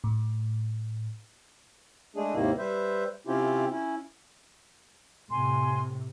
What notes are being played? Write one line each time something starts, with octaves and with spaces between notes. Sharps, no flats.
A2
G#3 A3 D4 G#4
D#2 G#2 C3 D#3 A#3 E4
G3 B4 C5 E5
C3 C4 C#4 E4 F4 G4
C#4 E4
A2 C3 G#5 C6